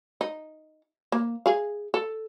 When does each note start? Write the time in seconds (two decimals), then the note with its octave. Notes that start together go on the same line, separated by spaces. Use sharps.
0.21 D#4
1.12 A#3
1.46 G#4 F5
1.94 A4